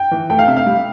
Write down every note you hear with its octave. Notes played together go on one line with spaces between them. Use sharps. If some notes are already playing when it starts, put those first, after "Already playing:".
Already playing: G5
E3
A3 G5
F5
C3 E5
F5
G3